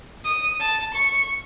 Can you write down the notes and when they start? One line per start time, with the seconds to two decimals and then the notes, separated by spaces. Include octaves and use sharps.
0.24 D#6
0.60 A5
0.94 C#6